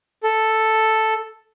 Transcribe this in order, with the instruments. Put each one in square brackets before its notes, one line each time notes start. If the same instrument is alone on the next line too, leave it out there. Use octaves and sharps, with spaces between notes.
[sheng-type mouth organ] A4